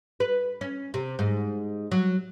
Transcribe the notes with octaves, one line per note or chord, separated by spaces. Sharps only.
B4
C#4
C3
G#2
F#3